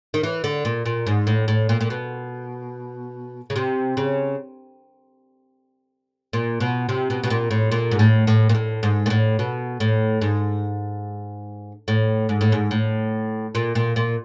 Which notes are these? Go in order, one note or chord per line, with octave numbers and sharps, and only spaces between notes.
D#3
E3
D3
A#2
A#2
G#2
A2
A2
A#2
A#2
B2
C#3
C3
C#3
A#2
B2
C3
B2
B2
A#2
A2
A#2
G#2
A2
A2
A#2
A2
G#2
A#2
A2
B2
A2
G#2
A2
G#2
A2
G#2
A2
A#2
A#2
A#2